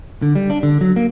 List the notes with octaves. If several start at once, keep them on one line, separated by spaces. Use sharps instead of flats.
D3
G3
D4
D3
F#3
A#3